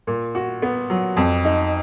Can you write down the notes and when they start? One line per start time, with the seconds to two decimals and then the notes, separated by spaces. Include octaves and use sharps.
0.07 A#2
0.35 F#4
0.62 B3
0.90 F#3
1.17 F2
1.45 D#4